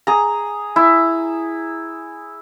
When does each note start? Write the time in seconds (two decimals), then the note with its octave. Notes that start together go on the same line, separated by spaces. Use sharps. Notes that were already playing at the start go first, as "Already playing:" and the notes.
0.07 G#4 A#5
0.76 E4